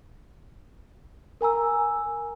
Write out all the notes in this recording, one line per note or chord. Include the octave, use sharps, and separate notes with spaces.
A#4 G#5 A#5 E6